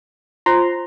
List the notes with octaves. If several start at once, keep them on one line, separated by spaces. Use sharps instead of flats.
F4 C5 A#5 C6